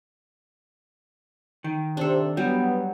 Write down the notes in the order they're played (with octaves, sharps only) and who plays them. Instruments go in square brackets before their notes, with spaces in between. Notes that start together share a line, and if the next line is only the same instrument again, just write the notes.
[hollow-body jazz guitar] D#3
[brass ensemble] C3 C5 [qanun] D4 A4
[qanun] F#3 [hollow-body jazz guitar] G3 [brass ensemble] B3